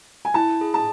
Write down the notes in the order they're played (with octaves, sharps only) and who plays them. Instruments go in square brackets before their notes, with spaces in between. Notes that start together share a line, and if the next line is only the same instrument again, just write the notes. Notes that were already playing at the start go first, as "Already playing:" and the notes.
[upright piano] G#5
[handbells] E4 [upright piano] A5
[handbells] G#4
[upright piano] A5